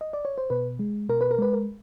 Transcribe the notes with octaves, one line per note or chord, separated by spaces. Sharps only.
D#5
D5
C#5
C5
B2 B4
G#3
B2 A#4
B4
A#4
G#3 B4
A#4